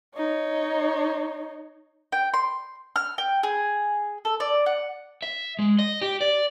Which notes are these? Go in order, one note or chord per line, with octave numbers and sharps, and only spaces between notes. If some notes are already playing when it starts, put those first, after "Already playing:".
D#4 C#5
G5
C6
F6
G5
G#4
A4
D5
F#5
E5
G#3
D#5
G4
D5